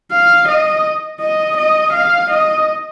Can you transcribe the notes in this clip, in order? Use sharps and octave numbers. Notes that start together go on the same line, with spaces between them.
F5
D#5
D#5
D#5
F5
D#5